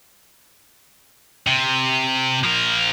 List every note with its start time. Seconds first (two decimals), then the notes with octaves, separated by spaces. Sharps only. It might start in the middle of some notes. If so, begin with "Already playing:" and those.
1.47 C3
2.44 F3 A#4